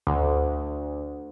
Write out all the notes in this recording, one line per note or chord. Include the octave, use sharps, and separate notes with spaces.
D2